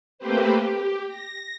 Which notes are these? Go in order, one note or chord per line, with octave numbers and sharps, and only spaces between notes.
A3 A#3 C4 G4 B4 C5
G4
A#6